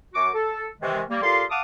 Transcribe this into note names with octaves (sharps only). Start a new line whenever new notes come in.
F#2 F#4 D6
A4
C3 D#3 E3 G#3
G3 A#3
A#2 F4 G4 A4 F5 C6
F5 F#5 A5 D6 D#6